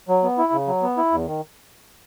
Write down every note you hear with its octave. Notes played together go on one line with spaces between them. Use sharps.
F#3
B3
E4
C#3
F#3
B3
E4
E2
D#3